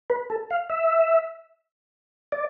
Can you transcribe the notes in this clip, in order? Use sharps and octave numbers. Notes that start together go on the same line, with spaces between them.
B4
A4
F5
E5
D5